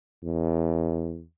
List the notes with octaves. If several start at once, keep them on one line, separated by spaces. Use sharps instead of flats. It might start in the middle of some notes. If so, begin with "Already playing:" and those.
E2